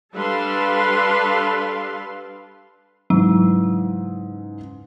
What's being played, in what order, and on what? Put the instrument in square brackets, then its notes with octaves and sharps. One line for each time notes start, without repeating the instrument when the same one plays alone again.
[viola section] G3 D4 A4 B4 F5 C6
[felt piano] G#2 C#3 E3 [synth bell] F#3